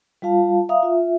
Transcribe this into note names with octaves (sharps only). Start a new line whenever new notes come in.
G3 F4 F5 A5
E5 F5 A#5 D#6
F4 E5